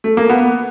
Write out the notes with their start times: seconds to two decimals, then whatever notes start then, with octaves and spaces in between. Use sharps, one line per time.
0.04 A3
0.17 A#3
0.29 B3